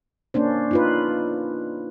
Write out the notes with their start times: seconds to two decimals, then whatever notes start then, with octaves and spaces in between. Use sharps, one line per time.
0.34 A#3 C#4 D4 C5
0.71 D#4 F4 B4